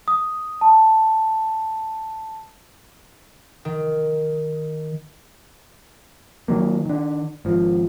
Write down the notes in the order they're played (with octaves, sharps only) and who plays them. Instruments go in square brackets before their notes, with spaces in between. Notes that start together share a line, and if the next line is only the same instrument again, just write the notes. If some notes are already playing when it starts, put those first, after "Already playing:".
[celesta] D#6
A5
[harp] D#3
[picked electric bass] D#3 F#3 A#3
D#3 D4
G#1 F3